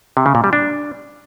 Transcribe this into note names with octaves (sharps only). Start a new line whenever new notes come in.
C3
C#3
A#2
G3
D4